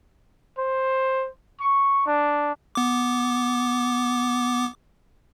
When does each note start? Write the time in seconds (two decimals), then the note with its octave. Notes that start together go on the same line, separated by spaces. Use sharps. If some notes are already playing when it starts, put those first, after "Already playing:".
0.58 C5
1.61 C#6
2.07 D4
2.75 B3 D6